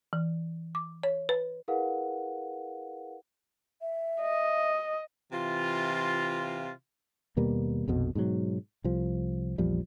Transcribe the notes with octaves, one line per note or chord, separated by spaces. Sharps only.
E3
D6
C#5
B4
E4 G#4 A#4 B4 F5 F#5
E5
D#5
C3 E3 F4
D#2 B2 G3 A#3
A#1 F2 B2
G#2 B2 D3 F#3
C2 F3
A#1 E2 F3 G3